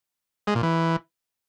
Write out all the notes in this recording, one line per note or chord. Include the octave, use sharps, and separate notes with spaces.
G#3
A#2
E3